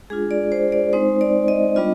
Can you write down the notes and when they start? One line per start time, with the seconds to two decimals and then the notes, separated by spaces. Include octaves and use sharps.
0.10 G#3 D4 F4 G#4
0.31 D5
0.52 C5
0.72 D5
0.93 G#3 C4 D#4 C5
1.21 D5
1.48 D#5
1.76 G3 B3 D4 F4 D#5